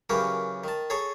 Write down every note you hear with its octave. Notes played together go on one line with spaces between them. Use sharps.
F#2 C#3 E3 C#4 G4 A#4
D#3 A5
G#4 A4 C#5 G#5 A#5